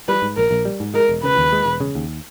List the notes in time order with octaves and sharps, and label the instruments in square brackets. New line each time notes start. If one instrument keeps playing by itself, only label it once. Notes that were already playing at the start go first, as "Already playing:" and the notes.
[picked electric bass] G3 [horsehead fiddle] B4
[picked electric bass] G#2
[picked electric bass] A#1 [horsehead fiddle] A#4
[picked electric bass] A#1
G3
G#2
[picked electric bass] G#3 [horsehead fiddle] A#4
[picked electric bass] E1
[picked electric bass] C#3 [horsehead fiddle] B4
[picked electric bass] D#2
G#3
E1
C#3
D#2